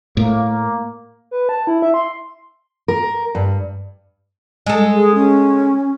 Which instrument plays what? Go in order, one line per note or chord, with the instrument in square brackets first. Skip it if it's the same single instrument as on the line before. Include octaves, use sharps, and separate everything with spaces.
[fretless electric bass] A2 [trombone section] A#3
[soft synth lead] B4
A5
E4
E5
C6
[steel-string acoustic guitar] A#4
G2
[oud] G#3 A4
[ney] G#4
C#4